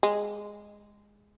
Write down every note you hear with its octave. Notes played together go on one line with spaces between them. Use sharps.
G#3